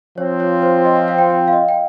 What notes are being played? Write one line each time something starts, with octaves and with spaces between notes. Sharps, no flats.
F3 C4 F4 C#5
C#5
C5
D#5
F5
G5
G5
F5
D#5
G5